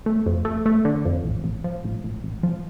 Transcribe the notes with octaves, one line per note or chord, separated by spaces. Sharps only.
A3
F2
A3
A3
D3
F2
A1
A1
F3
A1
A1
A1
F3